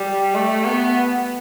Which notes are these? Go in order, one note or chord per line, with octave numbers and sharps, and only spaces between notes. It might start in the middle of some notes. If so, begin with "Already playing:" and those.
Already playing: G3
A3
B3